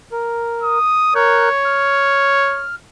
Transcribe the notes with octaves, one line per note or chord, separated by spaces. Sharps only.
A#4
D#6
A#4 C#5 F#6 G6
F6